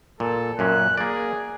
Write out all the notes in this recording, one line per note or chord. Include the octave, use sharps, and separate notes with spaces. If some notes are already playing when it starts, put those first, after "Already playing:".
A#2 A4
F#2 A#2 C#4 F#6
A#3 G#4 D5